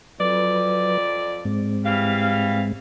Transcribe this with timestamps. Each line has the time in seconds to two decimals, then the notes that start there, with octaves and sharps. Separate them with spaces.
0.20 F2 F#3 B4 D5
1.45 G#2 G#3 C4
1.85 E3 G3 F5